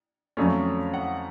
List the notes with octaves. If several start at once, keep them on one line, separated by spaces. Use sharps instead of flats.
F2 D3 F#3 A3 C#4
F#5